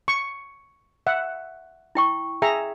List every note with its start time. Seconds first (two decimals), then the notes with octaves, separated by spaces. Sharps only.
0.08 C#6
1.07 E5 F#5
1.95 E4 G5 C#6
2.42 G#4 E5 G5 A#5